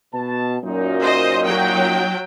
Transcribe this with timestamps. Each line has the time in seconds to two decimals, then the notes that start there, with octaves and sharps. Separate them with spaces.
0.13 B2 A5
0.63 F#2 A#2 D#4
1.00 C5 D#5
1.46 F#3 G5